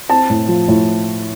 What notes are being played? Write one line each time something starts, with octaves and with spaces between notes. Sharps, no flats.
C4 A5
A2
F3
A2